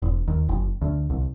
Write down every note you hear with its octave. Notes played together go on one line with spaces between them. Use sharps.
E1
D#2
F#1
D2
C2